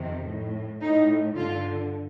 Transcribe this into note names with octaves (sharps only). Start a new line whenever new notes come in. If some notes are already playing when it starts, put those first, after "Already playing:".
Already playing: F2 C3 D#3
A2
A2 D#4
G2 D3 F4